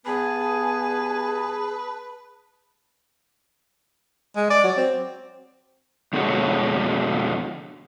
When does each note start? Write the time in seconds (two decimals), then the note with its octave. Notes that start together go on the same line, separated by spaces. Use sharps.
0.06 G2 B3 G#4 B4 G#5 A5
4.36 G#3
4.50 D5
4.64 F#3
4.77 C4
6.13 F2 B2 D3 G#3 F#4 C#5